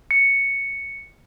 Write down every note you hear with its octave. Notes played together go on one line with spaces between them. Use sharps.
C#7